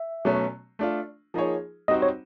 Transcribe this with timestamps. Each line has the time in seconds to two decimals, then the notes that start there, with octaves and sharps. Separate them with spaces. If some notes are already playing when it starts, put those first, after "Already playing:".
Already playing: E5
0.25 B2 F#3 A3 C#4
0.79 A3 D4 F4
1.34 F3 A#3 D#4 G#4 C#5
1.88 G3 C4 D#4 F#4 D#5
2.02 C#5